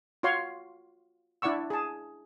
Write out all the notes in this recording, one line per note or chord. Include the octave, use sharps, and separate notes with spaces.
F4 F#4 C#5 F5 C6
D4 E4 D5 F#5 C#6 E6
G#4 A5